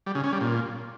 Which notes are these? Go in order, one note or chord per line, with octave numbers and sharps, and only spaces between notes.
G3
C#3
C#4
G3
A#2